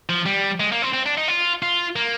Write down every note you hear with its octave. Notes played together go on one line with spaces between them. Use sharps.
F3
G3
G#3
A#3
C4
C4
D4
D#4
F4
F4
A#3